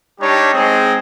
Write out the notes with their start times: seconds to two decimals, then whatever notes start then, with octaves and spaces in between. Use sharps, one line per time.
0.21 G3 D4 D#4 G4 C#5
0.54 G#3 C4 D#4 G#4